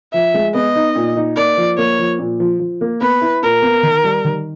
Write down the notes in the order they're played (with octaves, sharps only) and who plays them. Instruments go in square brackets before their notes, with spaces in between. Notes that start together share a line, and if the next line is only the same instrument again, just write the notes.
[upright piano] F3 [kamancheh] E5
[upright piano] G#3
[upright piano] B3 [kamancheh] D#5
[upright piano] D#4
A#2
D#4
[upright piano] A#3 [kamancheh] D5
[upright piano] F3
[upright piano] A#3 [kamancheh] C#5
[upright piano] F3
A#2
F3
F3
A#3
[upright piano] B3 [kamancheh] B4
[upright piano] E4
[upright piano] A#2 [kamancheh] A#4
[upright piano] B3
D#3
G3
D#3